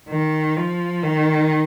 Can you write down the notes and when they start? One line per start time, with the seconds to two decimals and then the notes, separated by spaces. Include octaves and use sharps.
0.09 D#3
0.57 F3
1.03 D#3